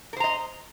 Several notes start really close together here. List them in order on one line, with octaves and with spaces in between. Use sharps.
A#4 C5 A#5 D#5